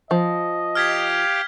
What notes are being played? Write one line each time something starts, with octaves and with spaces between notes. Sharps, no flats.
F3 D#5
G4 F5 D6 F6 G#6 B6